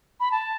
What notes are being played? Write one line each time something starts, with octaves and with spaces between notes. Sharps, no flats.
B5
A5